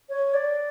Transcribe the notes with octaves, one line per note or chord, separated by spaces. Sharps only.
C#5
D5